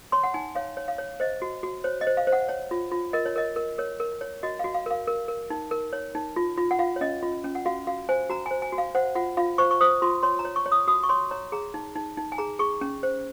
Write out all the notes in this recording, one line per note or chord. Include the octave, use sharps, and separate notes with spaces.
C#5 C6
F#5
D#4 G#5
C#5 F5
C#5
F5
C#5
C5 D#5
F#4
F#4
C5 C#5
D#5
C5
F5
C5
F#5
C#5
F4
F4
A#4 D#5
C#5
A#4 D#5
A#4
A#4 C#5
A#4
C#5
F#4 D#5
F#4 F5
F5
A#4 F5
A#4
A#4
D#4
A#4
C#5
D#4
F4
F4
F#5
F4 F5
C#5
C#4 D#5
F4
C#4
F#5
F#4 F5
F#4 F5
C5 G#5
F#4 A#5
G#5
C5
G#5
F#4
F5
C5 F#5
F4 F#5
F4 F5
C5 C#6
C#6
C5 D#6
F4 C6
C#5 C6
A#5
C#5
C#6
C#5
D#6
F#4 D#6
C#6
C#5 C6
C#5 A#5
G#4 A#5
D#4
D#4
D#4
G#5
G#4 A#5
G#4 C#6
C#4
C5